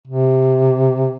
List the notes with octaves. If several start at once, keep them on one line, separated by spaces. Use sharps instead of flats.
C3